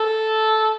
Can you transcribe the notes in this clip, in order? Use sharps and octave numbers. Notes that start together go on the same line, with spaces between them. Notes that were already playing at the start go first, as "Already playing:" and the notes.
Already playing: A4